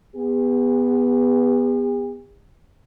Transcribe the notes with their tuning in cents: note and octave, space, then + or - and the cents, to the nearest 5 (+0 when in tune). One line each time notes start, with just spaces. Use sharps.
B3 +0 G#4 -45